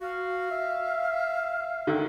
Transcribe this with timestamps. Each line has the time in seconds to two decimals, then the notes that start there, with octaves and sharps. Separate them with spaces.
0.01 F#4 F5
0.51 E5
1.87 D3 D#3